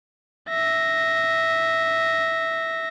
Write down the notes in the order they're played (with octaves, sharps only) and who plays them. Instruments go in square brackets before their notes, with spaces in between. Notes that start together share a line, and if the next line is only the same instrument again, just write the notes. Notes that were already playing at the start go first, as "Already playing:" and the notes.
[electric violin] E5 A#6